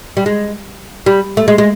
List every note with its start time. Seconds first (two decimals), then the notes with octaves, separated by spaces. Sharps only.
0.17 G3
0.26 G#3
1.06 G3
1.37 A3
1.48 G#3
1.58 G#3